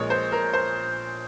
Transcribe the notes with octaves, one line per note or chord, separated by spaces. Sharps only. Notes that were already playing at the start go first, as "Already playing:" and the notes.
Already playing: A#1 A#2 G#3 C#5
C5
A#4
C5